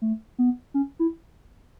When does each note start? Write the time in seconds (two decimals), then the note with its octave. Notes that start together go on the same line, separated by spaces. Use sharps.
0.02 A3
0.38 B3
0.74 C#4
0.99 E4